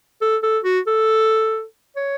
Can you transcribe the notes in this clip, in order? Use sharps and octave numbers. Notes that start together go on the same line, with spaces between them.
A4
A4
F#4
A4
C#5